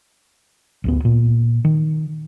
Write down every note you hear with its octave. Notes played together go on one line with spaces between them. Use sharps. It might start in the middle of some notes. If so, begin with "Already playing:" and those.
A1 D2 B3
A#2
D#3